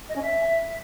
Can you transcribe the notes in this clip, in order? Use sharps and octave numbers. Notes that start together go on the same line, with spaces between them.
D#5
C#4
E5